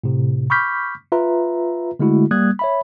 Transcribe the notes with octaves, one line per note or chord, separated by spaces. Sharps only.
A2 C3
B5 C#6 D6 F6 G6 B6
F4 B4 E5 A#5
D3 G#3 A3 E4 F#4
G3 A#3 D#6 F#6 G#6
C#5 E5 B5